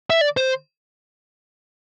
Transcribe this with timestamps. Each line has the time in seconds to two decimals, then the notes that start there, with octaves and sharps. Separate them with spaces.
0.10 E5
0.21 D5
0.37 C5